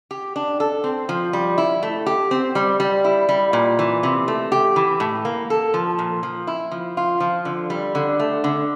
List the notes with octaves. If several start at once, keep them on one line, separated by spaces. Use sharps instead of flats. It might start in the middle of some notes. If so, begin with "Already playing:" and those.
G4
D4
A4
C4
F3
G3
E4
A3
G4
C4
G3
G3
E4
G3
A#2
E3
C3
A3
G4
E3
A2
A#3
A4
F3
A#2
F3
E4
F3
F4
F3
D3
G3
D3
A3
D3